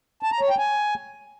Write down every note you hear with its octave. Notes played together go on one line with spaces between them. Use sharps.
A5
A#5
C#5
G5
G#5